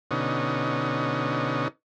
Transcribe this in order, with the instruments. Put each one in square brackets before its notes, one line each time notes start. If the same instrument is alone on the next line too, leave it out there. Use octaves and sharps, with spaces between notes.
[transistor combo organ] B2 D3 C#4 D#4